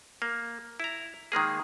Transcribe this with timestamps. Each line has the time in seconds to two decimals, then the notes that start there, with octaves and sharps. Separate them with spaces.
0.22 A#3
0.80 E4 A#5
1.32 D#3 G#3 A#3 G#4